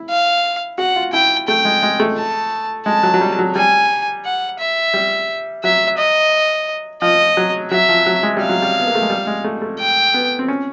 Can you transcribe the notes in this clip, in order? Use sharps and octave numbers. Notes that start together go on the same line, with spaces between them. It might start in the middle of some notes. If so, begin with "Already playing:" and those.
Already playing: E4
F5
F#4 F#5
F4
E4 G5
A3 G5
G#3
G#3
A3
A5
G#3 A5
F#3
F#3
G3
F#3
G3 G#5
F#5
E5
G3
F#3 E5
D#5
F3 D#5
F#3
F#3 E5
F3
F#3
G#3
G3 F5
F#3
G3
B3
A#3
A3
G#3
G3
G#3
A3
A3
G5
B3
C4
C#4